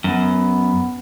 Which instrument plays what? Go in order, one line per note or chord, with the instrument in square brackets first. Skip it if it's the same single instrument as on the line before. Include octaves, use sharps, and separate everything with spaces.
[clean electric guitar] F#2 [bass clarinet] B3